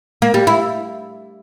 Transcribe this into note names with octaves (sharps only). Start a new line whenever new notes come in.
A#3
G3
E4